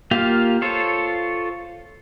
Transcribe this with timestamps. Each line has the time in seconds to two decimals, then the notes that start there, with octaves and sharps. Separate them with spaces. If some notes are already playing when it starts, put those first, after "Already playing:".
0.11 A#3 F4 G4 F5
0.62 F4 A4 C5 C#5